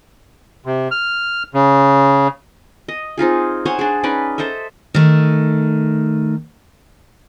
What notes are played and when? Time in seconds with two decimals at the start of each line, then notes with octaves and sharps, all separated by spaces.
0.66 C3
0.91 F6
1.54 C#3
2.88 D#5
3.18 C4 D#4 F4 G#4
3.65 C5 C#5 F#5 G#5
3.79 D4 G#4
4.03 C#4 D#4 B4 D5
4.38 A4 C5 D#5 E5
4.94 D#3 A3